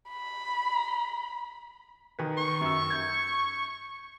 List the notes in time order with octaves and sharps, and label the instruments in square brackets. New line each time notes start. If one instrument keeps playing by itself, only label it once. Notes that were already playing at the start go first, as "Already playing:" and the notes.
[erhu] B5
[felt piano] D#3 B4
[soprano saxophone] C#6
[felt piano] F#2 E6
G6 G#6